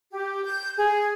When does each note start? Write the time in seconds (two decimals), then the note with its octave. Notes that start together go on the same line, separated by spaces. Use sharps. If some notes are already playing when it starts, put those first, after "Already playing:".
0.11 G4
0.45 G6
0.77 G#4